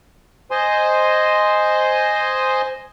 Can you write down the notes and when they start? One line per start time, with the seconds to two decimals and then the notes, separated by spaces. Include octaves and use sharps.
0.51 C5 D#5 G#5 C6